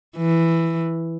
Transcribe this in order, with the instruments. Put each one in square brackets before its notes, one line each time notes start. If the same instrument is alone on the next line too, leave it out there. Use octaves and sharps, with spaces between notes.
[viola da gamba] E3